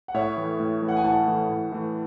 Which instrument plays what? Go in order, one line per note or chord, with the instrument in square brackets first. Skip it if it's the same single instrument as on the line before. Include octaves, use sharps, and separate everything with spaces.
[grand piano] F#5
[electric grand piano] A2 [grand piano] C#5 E5
[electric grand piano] E3 A3
A2
E3 A3
[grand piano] F#5
G#5
[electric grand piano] A2 [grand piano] F#5 A5
[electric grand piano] E3 A3
A2
E3 A3